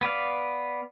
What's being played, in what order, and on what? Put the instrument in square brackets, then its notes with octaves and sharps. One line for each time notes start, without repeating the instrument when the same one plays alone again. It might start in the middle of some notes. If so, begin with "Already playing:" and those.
[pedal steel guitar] B3 B4 D5 F5